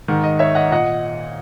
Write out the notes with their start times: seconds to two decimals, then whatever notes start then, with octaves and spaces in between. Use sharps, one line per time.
0.08 G#2 D#3
0.23 D#5
0.39 C#5 E5
0.55 D#5 F#5
0.71 A#2 D#5 F#5